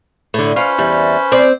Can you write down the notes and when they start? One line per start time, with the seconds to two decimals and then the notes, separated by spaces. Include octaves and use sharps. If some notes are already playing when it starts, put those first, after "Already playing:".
0.34 A2 D3
0.56 C#4 F4 B4 C5
0.78 E2 G3
1.32 C4 D5